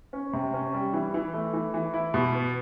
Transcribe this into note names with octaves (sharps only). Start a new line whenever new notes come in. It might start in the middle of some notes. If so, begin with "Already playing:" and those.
C#4
C3
C#4
G3
E3
E3
A3
E3
E3
E4
B2
B3